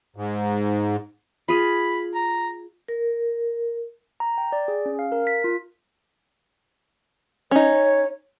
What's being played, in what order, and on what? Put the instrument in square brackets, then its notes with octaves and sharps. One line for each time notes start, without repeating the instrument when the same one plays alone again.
[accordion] G#2
[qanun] F4 G#4 [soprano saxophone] B5
[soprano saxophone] A#5
[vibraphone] A#4
[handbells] A#5
G5
D5
G#4
C#4
F5
A#4
B6
F4
[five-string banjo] C#4 D#4 [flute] C#5